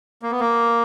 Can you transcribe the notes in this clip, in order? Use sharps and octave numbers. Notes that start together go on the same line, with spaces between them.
A#3
B3
A#3